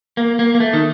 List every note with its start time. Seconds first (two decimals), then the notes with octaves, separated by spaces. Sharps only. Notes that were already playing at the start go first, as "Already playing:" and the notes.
0.17 A#3
0.39 A#3
0.55 A#3
0.60 A3
0.73 D#3